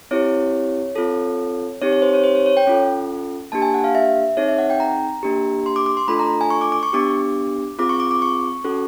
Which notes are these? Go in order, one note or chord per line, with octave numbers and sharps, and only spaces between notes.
C4 E4 G4 C#5
C4 F4 A4
C4 D#4 G4 C#5
C#5
C5
C#5
C5
C#5
C#5
G5
C#4 F4 A4
A#3 D4 G4 A5
G#5
F#5
F5
E5
C4 D#4 G#4 C#5
E5
F#5
G5
A#5
A#3 D4 G4
C6
D6
D6
C6
A3 D4 F4 A4 B5
A#5
G#5
C#6
D6
D6
C#6
B3 D4 G4 D6
C4 F4 G#4 D6
C#6
D6
D6
C#6
C#4 F#4 A4